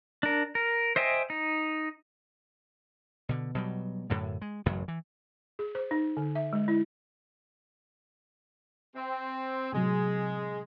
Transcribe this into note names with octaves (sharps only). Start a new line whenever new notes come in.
D4 A#4
A#4
C5 D#5 E5 G5 G#5
D#4
B2 D3
B2 F#3 G3
F#2 A2 D3
G#3
A1 F#2 C#3 F#3
E3
G#4
C5
D#4
D3
E5
G#3
E4
C4
A2 C3 F#3 G#3 G#4